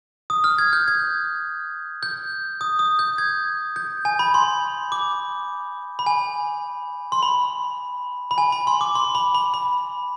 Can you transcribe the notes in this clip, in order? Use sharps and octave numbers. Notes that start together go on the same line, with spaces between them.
D#6
F6
G#6
G6
G#6
G6
D#6
D#6
G6
G#6
G6
G#5
B5
C6
D6
B5
G#5
C6
B5
B5
G#5
B5
C6
D6
C6
B5
B5
B5